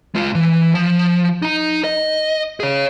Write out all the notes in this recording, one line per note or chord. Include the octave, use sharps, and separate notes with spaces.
G#3 F4
E3
F3
D#4 A#5
D#5
G#4 C#5